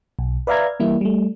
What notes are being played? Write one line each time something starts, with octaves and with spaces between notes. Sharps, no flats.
B1
B4 D5 E5 F5 A#5 G#6
E3 G3 A#3 E4
G3 A3